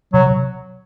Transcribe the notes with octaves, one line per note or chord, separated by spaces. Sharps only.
C3 F#3
C3